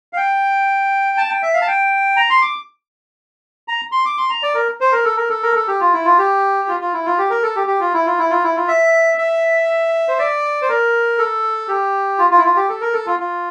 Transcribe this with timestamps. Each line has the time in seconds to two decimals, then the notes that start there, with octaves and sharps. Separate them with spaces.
0.13 F5
0.17 G5
1.17 A5
1.29 G5
1.42 E5
1.54 F5
1.62 A5
1.68 G5
2.17 A#5
2.30 C6
2.42 D6
3.68 A#5
3.92 C6
4.05 D6
4.18 C6
4.30 A#5
4.43 D5
4.55 A#4
4.81 C5
4.92 A#4
5.04 A4
5.17 A#4
5.29 A4
5.43 A#4
5.56 A4
5.68 G4
5.80 F4
5.93 E4
6.05 F4
6.18 G4
6.68 F4
6.80 F4
6.93 E4
7.06 F4
7.18 G4
7.30 A#4
7.43 A4
7.56 G4
7.67 G4
7.80 F4
7.93 E4
8.06 F4
8.19 E4
8.30 F4
8.43 E4
8.56 F4
8.68 E5
9.18 E5
10.08 C5
10.19 D5
10.62 C5
10.69 A#4
11.18 A4
11.68 G4
12.18 F4
12.30 F4
12.37 E4
12.44 F4
12.56 G4
12.69 A4
12.81 A#4
12.93 A4
13.06 F4
13.19 F4